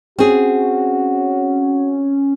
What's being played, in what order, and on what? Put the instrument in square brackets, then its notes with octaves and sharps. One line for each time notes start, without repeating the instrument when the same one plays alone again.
[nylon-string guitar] C4 G#4 [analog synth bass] C#4 [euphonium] F#4